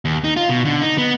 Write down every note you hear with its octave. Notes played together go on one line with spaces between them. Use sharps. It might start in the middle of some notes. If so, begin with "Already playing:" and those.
D#2
D#4
F4
B2
D3
D#4
B3